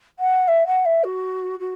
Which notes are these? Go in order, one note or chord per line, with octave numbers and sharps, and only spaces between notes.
F#5
E5
F#5
E5
F#4
F#4